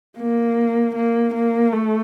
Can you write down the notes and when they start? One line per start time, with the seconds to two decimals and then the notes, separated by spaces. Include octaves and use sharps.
0.18 A#3
0.95 A#3
1.35 A#3
1.73 A3